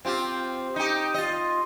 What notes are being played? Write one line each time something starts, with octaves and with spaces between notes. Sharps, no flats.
C4 F4 G4
D#4 G4
F4 D#5